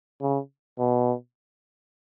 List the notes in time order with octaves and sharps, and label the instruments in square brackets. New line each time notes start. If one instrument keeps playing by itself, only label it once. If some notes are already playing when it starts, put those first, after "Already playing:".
[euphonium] C#3
B2